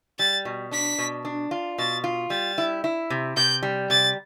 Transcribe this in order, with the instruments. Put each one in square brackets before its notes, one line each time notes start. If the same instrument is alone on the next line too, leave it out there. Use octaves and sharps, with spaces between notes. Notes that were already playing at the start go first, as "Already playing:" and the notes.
[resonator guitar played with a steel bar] G3 [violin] A6
[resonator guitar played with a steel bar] B2
[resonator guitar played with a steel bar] D4 [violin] B6
[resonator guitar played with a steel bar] B2
D4
F4
[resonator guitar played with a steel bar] B2 [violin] A6
[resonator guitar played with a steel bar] F4
[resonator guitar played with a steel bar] G3 [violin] A6
[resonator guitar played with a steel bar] E4
E4
C3
[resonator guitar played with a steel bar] C3 [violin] G6
[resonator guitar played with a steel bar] G3
[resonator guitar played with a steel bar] C3 [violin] A6